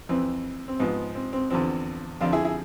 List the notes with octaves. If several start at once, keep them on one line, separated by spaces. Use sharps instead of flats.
F2 E3 C4
C4
G#2 F3 B3
C4
C4
E2 D3 F3 C4
F2 D3 F3 D4 F4
E4 G#4
E4 G#4